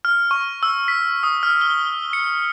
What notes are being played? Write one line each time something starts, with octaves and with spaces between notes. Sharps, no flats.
F6
C#6
E6
B6
D#6
F6
G7
C#7